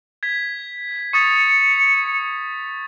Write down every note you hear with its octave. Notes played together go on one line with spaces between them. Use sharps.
G#6 B6
C#6 D#6 A6 C#7